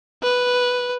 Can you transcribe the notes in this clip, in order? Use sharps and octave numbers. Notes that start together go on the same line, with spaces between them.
B4